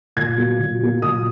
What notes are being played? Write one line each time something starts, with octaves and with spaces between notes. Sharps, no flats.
A#2 G#6
F#3 A#3
A#2
F#3 A#3
A#2 D#6